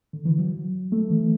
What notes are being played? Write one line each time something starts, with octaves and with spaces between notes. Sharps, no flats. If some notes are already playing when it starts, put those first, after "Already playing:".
D3
E3
F#3
A3
E3